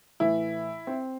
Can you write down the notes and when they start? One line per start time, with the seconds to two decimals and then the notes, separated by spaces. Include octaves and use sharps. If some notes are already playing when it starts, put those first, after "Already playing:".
0.20 A2 E3 E4
0.87 C4